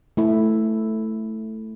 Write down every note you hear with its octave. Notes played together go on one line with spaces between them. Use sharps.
A3 E4 E5